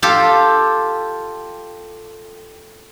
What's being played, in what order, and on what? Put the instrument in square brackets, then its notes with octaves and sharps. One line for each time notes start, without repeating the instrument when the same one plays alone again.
[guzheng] F4 G4 A4